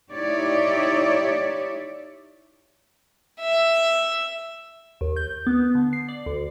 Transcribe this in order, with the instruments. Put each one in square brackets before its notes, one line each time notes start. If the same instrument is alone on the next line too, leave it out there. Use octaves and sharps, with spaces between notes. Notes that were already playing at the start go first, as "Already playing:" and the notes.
[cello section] D#4 E4 G4 C#5 D5 E5
[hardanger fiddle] E5
[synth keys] D#2
G6
B3
D3
C7
D5
D2